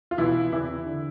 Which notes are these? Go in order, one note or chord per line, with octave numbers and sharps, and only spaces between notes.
F4
C2 B2 E3 E4
E2 C3 E3 E4
D3